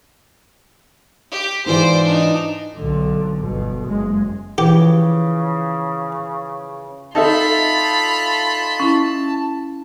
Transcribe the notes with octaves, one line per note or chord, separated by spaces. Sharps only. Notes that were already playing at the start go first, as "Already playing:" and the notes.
G4
G#2 E3 F4 C5 D5
D4 D#4
B1 D3
G1 B2
F#1 G#3
C#3 E3 F3 G4
D#4 F4 A4 E5 A5 B5
C#4 E4